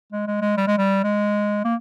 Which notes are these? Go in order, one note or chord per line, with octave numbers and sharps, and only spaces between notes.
G#3
G#3
G#3
G3
G#3
G3
G#3
A#3